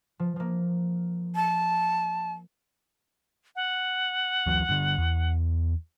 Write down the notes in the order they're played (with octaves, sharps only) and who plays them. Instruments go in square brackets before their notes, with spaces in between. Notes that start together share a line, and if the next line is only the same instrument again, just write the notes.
[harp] F3
F3 A#3
[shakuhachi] A5
[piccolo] F#5
[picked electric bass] D2 E3 F#3
G2 D3
E2